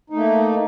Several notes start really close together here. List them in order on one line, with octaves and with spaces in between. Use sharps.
D#4 A3 A#3